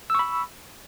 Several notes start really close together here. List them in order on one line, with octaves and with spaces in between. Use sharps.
E6 C#6 B5